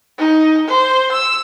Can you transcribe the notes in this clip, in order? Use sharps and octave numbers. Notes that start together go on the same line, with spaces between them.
D#4
C5
E6